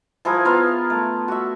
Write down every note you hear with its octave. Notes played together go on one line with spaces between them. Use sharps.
F3 E4 G#4 A#4
B3 F4 A#4 F5
A3
F#4 E5